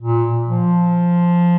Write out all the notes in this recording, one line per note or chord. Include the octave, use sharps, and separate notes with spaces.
A#2
F3